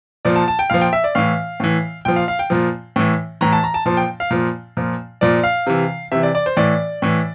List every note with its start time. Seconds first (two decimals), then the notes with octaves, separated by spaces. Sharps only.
0.25 A#2 F3 D5
0.36 A5
0.48 A5
0.59 G5
0.70 A#2 F3 F5
0.81 G5
0.93 E5
1.04 D5
1.15 A2 E3 F5
1.60 A2 E3
2.05 A#2 F3 G5
2.16 F5
2.28 F5
2.39 G5
2.50 A#2 F3
2.96 A2 E3
3.41 A2 E3 A#5
3.53 A5
3.64 A#5
3.74 A5
3.86 A#2 F3 A5
3.97 G5
4.20 F5
4.31 A#2 F3
4.77 A#2 F3
5.21 A#2 F3 D5
5.43 F5
5.67 C3 E3
6.12 C3 E3 E5
6.23 D5
6.35 D5
6.46 C5
6.57 A2 E3 D5
7.02 A2 E3